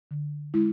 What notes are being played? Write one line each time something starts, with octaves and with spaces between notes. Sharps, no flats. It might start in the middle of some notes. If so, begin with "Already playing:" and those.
D3
G#3 E4